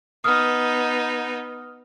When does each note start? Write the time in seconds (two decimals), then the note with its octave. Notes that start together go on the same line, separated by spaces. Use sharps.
0.24 B3 D#4 D#6 F6